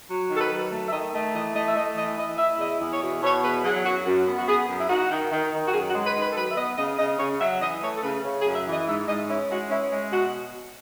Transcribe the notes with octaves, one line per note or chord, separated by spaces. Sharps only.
F#3
D#3
A4
B4
F#3
A3
E5
D#3 D#5
A3 D#5
E3 D#5
A3 D#5
E5
A3 D#5
E3 D#5
E4 D#5
E4 E5
E2 D#5
E2
C#5
B2
B2 C#5
E2 B4
F#3 G#4
F#2 F#4
F#2
B3
F#4
B3 G#4
F#2
E4
D#4 F#4
D#3
D#3
D#3
F#4
F#2 G#4
F#4
G#3
B4
D#3
B4
A4
F#3 B4
E5
B3 D#5
C#3 D#5
C#3 D#5
C#3 C#5
F#3 E5
E3 D#5
A3 C#5
A4
C#3 B4
C#3
G#4
F#2
E5
E3 D#5
G#2 E5
G#2 D#5
C#4 E4
G#3 F#4
C#4 E4
G#3
B2 F#4